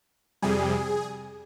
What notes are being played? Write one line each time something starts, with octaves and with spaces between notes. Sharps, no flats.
F2 C3 G3 G#4